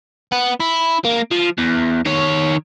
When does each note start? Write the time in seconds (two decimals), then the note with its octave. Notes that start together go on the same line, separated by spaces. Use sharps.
0.32 B3
0.60 E4
1.05 A#3
1.31 F3
1.58 E2
2.06 D#3 C#5